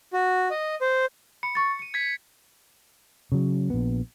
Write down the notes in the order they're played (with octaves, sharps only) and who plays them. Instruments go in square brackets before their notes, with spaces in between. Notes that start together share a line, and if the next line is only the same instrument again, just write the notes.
[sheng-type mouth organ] F#4
D#5
C5
[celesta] B5 [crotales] C#7
[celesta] C#6 A6
C#7 D#7
[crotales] G#6 B6
[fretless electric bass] C#3 F#3
A#1 B3